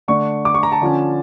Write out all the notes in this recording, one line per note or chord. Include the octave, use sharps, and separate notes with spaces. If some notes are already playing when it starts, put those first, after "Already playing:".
D3 A3 D4 C#6
D6
C#6
A#5
A5
D3 F3 C#4